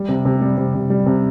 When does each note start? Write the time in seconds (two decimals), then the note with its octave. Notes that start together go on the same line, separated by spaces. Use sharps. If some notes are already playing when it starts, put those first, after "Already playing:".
Already playing: G3
0.09 C3
0.25 C3
0.41 G3
0.57 C3
0.74 C3
0.90 G3
1.06 C3